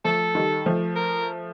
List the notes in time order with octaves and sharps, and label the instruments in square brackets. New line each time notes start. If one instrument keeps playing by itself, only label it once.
[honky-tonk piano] F3 A3 [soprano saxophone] A4
[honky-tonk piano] D#3 G3
F3 A3
[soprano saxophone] A#4